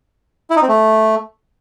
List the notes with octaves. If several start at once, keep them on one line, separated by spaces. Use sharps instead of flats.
E4
D#4
C4
A3